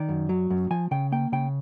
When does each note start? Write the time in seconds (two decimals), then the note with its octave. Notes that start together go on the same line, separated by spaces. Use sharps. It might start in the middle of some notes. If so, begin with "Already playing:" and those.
Already playing: D#3 D5
0.09 F#2
0.29 F#3
0.50 F#2
0.71 F3 G#5
0.91 C#3 G5
1.12 A#3 G5
1.32 C#3 G5